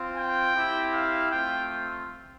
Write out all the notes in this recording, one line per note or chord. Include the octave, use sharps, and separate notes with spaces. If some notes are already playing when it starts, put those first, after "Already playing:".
Already playing: C4 F4
G5
C4 E4 G4
F5
A3 C4 F4 G5